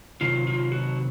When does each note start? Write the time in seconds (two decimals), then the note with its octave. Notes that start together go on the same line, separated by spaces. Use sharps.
0.21 C3 D#3 F#3 F4
0.47 F4
0.72 F#4